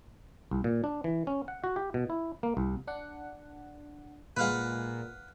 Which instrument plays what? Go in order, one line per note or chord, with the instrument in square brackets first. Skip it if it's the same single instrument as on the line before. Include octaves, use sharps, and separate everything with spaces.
[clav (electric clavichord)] C2
A#2
D4
E3
C#4
F#5
F#4
G4
B2
E4
A#3
C2
[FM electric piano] D4 F#5
[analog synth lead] A#2 [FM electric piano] G#3 F4 [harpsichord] B4 F5 F#5